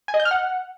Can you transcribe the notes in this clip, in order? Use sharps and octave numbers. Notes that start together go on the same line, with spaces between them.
G#5
D#5
G6
F6
F#5